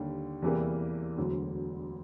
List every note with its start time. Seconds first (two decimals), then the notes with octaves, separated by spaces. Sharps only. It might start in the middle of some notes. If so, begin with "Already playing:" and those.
Already playing: D#2 D3 G3
0.42 E2 C3 E3 G3 A#3
1.18 E1 D2 D3 F#3